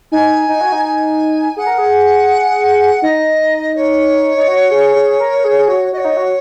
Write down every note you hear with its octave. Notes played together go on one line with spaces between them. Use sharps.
D#4 G#5
D#4
F#4
D#4
G#5
G#4 F#5
A#4
G#4
D#4 D#5
C#5
D#4
F#4
G#4
G#4
A#4
A#4
G#4
G#4
F#4
F#4 D#5
C#5
D#4
F#4